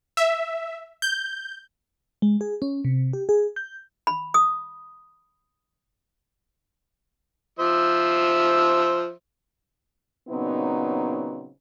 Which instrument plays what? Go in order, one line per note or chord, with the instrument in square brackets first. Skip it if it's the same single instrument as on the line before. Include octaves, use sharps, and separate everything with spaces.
[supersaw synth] E5
G6
[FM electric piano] G#3
G#4
C#4
C3
G4
G#4
G6
[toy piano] B5
D#6
[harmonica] F3 C5 E5
[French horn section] A#2 C#3 F#3 B3 C4 D#4